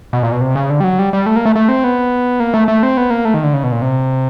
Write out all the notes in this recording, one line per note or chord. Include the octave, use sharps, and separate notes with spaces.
B2
A#2
B2
C3
C#3
D3
G3
F#3
G3
G3
A3
A#3
A3
A3
C4
B3
A#3
A3
A3
C4
B3
A#3
A3
D#3
D3
C#3
B2
A#2
C3